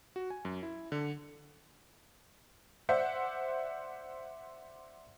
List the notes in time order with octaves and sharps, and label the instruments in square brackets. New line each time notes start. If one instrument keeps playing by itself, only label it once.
[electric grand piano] F#4
G#5
F#2
E4
D3
[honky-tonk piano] C5 D5 E5 F#5 G6